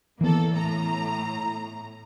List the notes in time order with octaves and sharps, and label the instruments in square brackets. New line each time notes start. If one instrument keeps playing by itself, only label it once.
[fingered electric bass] E3 B3 [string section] A#3 A4
[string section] A2 A#5